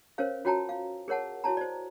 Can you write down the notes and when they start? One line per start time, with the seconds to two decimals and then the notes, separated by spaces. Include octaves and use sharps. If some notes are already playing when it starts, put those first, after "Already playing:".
0.18 C#4 A#4 C5 C#5 F5
0.45 F4 F#4 C#5 G5 A5 A#5
0.69 F5
1.08 G#4 A#4 C#5 F#5 A5
1.44 E4 F#4 C#5 A5 A#5
1.57 C5 D5